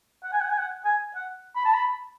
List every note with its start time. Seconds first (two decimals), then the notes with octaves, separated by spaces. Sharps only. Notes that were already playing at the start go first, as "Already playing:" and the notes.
0.24 F#5
0.33 G#5
0.41 F#5
0.49 G#5
0.58 F#5
0.85 G#5
1.16 F#5
1.56 B5
1.65 A5
1.74 B5